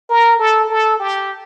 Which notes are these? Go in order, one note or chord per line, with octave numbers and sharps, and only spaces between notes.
A#4
A4
A4
G4